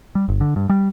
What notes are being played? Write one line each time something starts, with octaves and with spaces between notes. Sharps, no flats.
G3
G1
D3
G2
G3